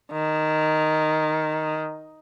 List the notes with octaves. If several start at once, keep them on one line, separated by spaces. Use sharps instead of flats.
D#3